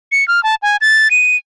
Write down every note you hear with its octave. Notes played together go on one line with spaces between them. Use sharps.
C#7
F6
A5
G#5
A6
D#7